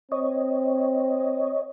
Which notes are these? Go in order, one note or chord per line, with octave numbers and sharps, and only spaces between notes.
C4 C#5 D#5